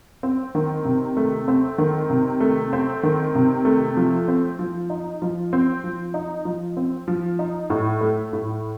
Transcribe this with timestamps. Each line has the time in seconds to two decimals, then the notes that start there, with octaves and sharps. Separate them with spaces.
0.23 C4
0.55 D#3
0.85 C3
1.17 A3
1.48 C4
1.78 D#3
2.10 C3
2.40 A3
2.73 C4
3.03 D#3
3.35 C3
3.65 A3
3.97 F3
4.28 C4
4.59 F3
4.90 D#4
5.22 F3
5.53 C4
5.84 F3
6.14 D#4
6.45 F3
6.77 C4
7.08 F3
7.39 D#4
7.70 A2
8.01 A3
8.33 A2